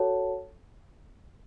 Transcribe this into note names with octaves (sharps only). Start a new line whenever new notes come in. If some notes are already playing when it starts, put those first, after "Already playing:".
Already playing: F#4 A4 C#5 F#5 A5